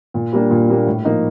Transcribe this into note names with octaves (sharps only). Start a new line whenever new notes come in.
A#2
G3 A#3 D4
A#2
G3 A#3 D4
A2
F3 A#3 D#4